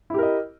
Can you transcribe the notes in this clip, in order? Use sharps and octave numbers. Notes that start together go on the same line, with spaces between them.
E4 G4 A#4 D#5